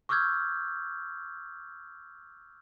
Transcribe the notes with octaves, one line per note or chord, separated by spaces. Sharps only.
C#6 D6 E6 F6 G6 G#6